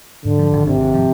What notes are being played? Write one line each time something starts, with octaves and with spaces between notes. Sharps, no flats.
G#2 D3
F3
G#1
G#1 C3
G#2
F3